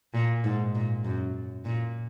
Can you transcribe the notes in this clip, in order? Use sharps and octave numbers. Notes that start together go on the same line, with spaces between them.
A#2
G#2
A#2
F#2
A#2